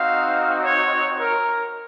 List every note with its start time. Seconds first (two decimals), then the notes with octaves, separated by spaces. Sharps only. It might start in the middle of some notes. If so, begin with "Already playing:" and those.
Already playing: C4 D#4 F#4 F5
0.62 C#5
1.18 A#4